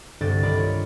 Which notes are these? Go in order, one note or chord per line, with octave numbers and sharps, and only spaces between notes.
C2 G2 D3 C4 G4 A6
D#3 F4 D5 B5
C#5